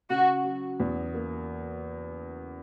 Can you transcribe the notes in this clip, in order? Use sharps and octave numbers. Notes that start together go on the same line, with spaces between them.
C#3 F#4
F#3
E2
A#3